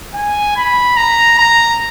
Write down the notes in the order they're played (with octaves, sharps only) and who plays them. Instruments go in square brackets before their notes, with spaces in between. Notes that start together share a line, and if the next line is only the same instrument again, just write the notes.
[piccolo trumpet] G#5
B5
A#5
A#5